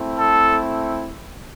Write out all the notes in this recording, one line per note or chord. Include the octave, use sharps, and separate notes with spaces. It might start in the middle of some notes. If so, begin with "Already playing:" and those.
Already playing: A3 C4 E4
A4